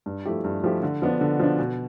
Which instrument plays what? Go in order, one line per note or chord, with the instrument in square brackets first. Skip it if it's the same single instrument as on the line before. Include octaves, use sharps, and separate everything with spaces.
[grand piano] G2
F3 A3 E4 G4
G2
F3 A3 E4 G4
D3
F3 B3 D4
D3
F3 B3 D4
B2